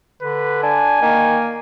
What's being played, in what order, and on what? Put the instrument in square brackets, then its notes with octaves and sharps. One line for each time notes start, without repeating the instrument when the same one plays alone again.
[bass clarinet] D3 [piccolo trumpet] B4
[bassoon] D4 [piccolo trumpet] G#5
[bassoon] D#3 [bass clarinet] A#3